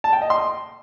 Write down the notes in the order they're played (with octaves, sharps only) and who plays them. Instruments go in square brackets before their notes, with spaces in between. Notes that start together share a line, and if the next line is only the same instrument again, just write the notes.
[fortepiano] A5
G5
D#5
C6